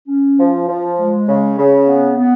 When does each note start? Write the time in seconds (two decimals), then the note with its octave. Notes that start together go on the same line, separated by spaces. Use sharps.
0.08 C#4
0.38 F3
0.69 F3
0.98 G#3
1.28 C#3
1.58 C#3
1.88 B3
2.17 B3